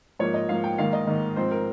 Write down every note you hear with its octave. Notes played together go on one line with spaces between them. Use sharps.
G#2 F3 A#3 C#5
D#5
G#2 F3 A#3 F5
G5
G#2 D#3 A#3 F5
D#5
G#2 D#3 A#3
G#2 F3 C4 C5
A#4